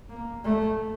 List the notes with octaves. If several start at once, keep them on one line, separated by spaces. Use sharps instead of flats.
A#3
A3